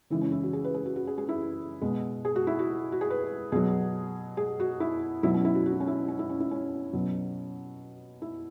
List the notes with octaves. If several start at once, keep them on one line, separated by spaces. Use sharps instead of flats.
C#3 E3 G#3 E4
C#4
E4
F#4
G#4
B4
G#4
F#4
F#4
G#4
G#4
E4
B2 G#3
G#4
F#4
E4
F#4
F#4
G#4
B4
B2 F#3 G#4
G#4
F#4
E4
B2 F#3 E4
C#4
E4
F#4
F#4
E4
C#4
E4
C#4
E4
C#4
E4
C#4
B2 F#3
E4